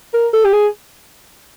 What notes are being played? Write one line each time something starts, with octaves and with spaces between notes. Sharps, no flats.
A#4
A4
G4
G#4